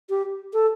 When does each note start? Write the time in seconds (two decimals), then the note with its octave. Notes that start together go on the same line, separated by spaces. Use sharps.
0.09 G4
0.53 A4